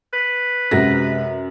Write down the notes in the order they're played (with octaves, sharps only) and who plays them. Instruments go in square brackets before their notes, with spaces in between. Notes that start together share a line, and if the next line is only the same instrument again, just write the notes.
[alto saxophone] B4
[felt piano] F#2 A#6 [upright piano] C3 G#3 F#4